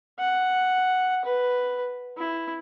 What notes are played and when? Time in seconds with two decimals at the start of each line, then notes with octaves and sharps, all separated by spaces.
0.19 F#5
1.25 B4
2.18 E4